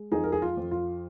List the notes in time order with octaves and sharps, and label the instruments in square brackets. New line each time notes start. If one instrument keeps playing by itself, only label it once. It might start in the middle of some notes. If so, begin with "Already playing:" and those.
Already playing: [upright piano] G#3
F2 D#4 G#4
A#4
G#4
F4
F2
F4